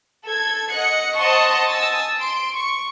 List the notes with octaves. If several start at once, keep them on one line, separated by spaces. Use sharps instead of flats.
A4 G#6
D#5 F#5 F#6 C#7
C5 D#5 F#5 A5 C6 C#6
G#5 A5 D#6 E6 A6
C6 D7
C#6